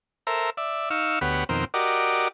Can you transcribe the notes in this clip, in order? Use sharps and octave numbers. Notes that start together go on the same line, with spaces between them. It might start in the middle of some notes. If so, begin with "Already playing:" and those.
A4 A#4 C5 E5 A#5
D5 E5
D#4 F5 C#6 E6
D2 B3 G4 C#5 F#5 B5
F2 B2 D#3 C4 A#4 C5
F#4 G4 A#4 D5 D#5 D6